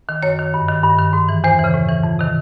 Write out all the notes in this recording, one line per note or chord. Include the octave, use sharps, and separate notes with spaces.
D#3
F#2 C#5
D#3
G2
D#3
G2
D#3
G#2
E3
E2 C5
E3
C#3
A2
E3
F2
C3 D#3